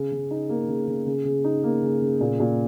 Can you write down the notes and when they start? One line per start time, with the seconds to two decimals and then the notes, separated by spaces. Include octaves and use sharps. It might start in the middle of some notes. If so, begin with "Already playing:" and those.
Already playing: C#3
0.11 C#3
0.31 D#4
0.49 A#3
0.68 C#3
0.87 C#3
1.06 C#3
1.25 C#3
1.44 D#4
1.63 A#3
1.82 C#3
2.01 C#3
2.21 A#2
2.40 A#2